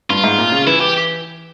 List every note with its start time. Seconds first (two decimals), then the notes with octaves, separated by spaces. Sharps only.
0.10 G2 F4
0.24 G#2
0.39 A#2
0.52 C#3
0.67 E3 E4
0.81 G4